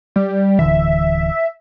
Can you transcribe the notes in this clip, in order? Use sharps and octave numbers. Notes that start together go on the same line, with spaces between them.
G3
D1 D3 E3 E5